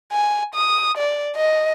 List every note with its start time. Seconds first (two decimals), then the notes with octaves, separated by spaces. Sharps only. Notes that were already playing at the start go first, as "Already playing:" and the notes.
0.12 G#5
0.55 D#6
0.97 D5
1.37 D#5